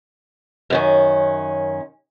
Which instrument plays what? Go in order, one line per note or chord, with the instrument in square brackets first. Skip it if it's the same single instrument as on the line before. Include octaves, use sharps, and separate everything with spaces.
[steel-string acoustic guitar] F#2 D#3 C#4